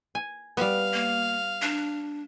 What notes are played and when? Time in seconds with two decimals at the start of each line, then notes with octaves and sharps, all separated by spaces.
0.15 G#5
0.57 G3 B3 F5
0.93 A#3
1.62 D4